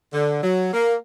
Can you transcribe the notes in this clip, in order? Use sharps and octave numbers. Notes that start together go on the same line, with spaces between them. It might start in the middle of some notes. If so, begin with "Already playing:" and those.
D3
F#3
A#3